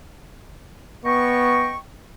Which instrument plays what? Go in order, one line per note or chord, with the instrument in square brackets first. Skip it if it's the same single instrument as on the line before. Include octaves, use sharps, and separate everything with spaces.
[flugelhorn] B3 [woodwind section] D#5 G5 C#6